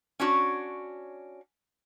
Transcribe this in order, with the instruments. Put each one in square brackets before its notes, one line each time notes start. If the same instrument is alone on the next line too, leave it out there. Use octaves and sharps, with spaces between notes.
[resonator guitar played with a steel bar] C#4 D4 F#4 C#5